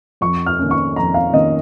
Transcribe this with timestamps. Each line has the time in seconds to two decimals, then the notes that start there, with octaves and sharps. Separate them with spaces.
0.21 F2 C#6
0.46 F6
0.59 D#3 A#3 C#4
0.71 C#6
0.96 F2 A#5
1.14 F5
1.33 D#3 A#3 C#4 D#5